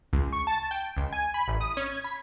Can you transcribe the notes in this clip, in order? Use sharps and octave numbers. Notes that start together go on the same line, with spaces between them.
C#2
C#6
A5
G5
C#2
G#5
B5
A1
D#6
C#4
G#6
B5